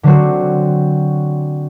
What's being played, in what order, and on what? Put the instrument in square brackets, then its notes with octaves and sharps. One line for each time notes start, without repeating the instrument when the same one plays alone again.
[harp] D3 F#3 C4 F#4